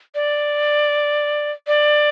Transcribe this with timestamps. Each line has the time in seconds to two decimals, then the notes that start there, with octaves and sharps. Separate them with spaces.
0.15 D5
1.67 D5